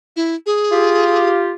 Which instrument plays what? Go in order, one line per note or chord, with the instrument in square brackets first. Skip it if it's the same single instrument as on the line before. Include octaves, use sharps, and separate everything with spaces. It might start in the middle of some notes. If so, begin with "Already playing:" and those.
[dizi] E4
G#4
[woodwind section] F4 G4